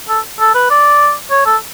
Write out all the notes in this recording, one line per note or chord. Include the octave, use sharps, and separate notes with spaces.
A4
A4
B4
D5
C#5
A4